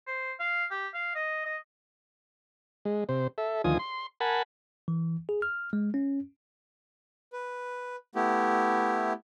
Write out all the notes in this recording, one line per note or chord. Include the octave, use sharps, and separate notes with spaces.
C5
F5
G4
F5
D#5
D#5
G#3
C3 C5
A4 E5
D2 D#3 F3 F4 G#5 D#6
C6
A#4 F#5 G#5 A5 B5
E3
G#4
F6
G#3
C#4
B4
A3 B3 E4 G4